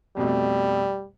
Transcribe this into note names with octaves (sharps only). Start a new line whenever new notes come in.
F2 B2 G3 A3